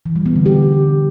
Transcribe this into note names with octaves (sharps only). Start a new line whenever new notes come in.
E3
G3
B3
D3
G4